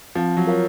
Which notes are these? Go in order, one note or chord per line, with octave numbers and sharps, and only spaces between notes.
F3 C4
F#3
F4 A#4 C#5 F5